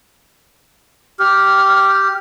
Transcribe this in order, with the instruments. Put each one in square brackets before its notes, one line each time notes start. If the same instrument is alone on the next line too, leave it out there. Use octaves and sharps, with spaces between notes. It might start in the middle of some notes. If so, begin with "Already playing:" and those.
[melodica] G4 [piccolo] F6